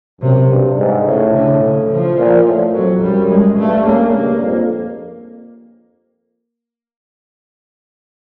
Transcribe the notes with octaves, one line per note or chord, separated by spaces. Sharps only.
F#2 C3
G2
G#2
A2 C#3
D3
C#3
F3
A#2
A2
F2 F#3
F#2 G3
G#3
G2 A3
C#3 A#3
G2 A#3
F2